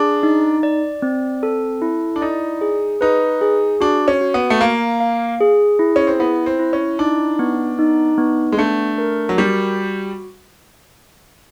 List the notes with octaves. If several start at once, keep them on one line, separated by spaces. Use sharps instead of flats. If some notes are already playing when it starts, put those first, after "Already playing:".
Already playing: D4 G#4
D#4
D5
C4
A4
E4
D4
D#4 D5
G#4
D#4 B4
G#4
D4 F#4
C#4
F#4
B3
A3
A#3 F5
F5
G#4
E4
C#4
C4
B3 E4
C4
E4
C#4
D4 D#4
B3
D#4
B3
G#3
A3 D4
A#4
F#3
G3 F#4